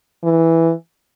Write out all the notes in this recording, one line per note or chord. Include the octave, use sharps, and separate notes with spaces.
E3